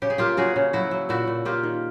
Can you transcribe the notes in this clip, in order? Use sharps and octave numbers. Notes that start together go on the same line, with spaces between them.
C#3 G4
G#4
A#3 F4 G4
C#3 F#4 G#4
C#3
F#3 E4 F#4
F#3
A#2 E4 F#4
A#2
A#3 F4 G4
D#3